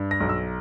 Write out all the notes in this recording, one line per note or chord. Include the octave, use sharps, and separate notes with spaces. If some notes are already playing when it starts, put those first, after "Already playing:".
Already playing: G2
A#6
B1
E6